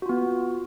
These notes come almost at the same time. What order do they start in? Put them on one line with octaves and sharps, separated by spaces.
F#4 F4 B3